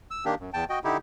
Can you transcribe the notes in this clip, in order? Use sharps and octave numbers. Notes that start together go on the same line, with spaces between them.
E6
D#3 A#3 D4 G4
F#2
E2 G5 A5
F#4 D#5 G5
D3 D#4 E4 G4